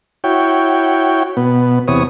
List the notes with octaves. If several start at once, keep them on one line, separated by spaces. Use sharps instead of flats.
E4 F#4 C#5 G5
B2 B3
E2 C3 B3 C#5 D#6